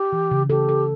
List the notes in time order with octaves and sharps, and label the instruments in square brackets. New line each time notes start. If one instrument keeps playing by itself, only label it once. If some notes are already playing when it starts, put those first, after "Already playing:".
Already playing: [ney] G4
[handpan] E3
C#3
[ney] G4 [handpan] A4
[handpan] A4